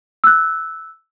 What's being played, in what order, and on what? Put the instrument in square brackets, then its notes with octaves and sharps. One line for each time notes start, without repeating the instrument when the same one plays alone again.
[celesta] E6 F#6